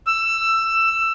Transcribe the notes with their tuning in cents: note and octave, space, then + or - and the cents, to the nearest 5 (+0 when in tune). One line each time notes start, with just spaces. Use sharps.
E6 +15